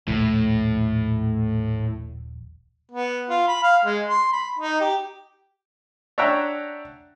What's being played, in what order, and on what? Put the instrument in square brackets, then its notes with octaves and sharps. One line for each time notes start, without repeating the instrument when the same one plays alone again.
[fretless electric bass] D#1 A#1 [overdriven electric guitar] A2
[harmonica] B3
F4
B5
F5
G#3
C6
B5
D#4
G4
[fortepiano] D4 C#5 E5 F#5 G5 A#5